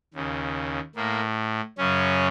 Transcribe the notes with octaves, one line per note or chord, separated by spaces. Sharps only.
D#2 C#3
A2 A#3
F#2 C#3 C#4